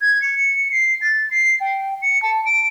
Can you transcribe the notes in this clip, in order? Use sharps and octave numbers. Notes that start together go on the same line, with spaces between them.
G#6
C#7
C7
A6
C7
G5
C#7
A5
D7